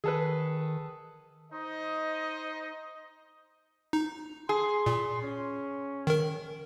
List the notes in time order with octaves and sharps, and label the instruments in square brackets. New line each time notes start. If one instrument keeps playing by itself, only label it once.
[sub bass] D#3 [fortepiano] G#4 A4 B4
[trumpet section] D#4 C5 D#5
[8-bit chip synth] D#4
[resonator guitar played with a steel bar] G#4 [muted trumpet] C6
[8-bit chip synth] A#2
[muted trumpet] C#4
[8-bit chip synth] D#3 A#4